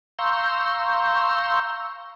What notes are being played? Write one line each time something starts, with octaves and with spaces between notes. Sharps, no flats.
F5 A#5 C6 C#6 E6 G6